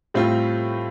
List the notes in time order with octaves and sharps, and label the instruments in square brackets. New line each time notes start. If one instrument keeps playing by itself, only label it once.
[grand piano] A2 G3 C4 F4